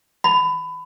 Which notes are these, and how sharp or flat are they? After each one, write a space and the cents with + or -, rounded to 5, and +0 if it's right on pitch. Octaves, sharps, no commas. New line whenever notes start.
B5 +25